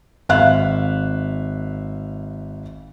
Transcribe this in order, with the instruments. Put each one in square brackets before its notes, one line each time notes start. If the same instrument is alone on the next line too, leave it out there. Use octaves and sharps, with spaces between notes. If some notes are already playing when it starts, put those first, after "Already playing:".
[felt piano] G#1 E5 F5 F#6